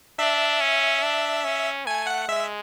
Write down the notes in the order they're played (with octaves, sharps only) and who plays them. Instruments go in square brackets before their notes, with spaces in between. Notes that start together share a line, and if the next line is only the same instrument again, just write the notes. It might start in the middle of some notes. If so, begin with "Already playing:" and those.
[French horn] D4 [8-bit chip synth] E5
[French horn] C#4
D4
C#4
[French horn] A3 [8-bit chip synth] G#5
[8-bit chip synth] F#5
[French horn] G#3 [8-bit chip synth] E5